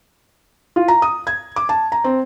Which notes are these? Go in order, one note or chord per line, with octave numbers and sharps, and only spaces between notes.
F4
A#5
D#6
G#6
D6
A5
A#5
C4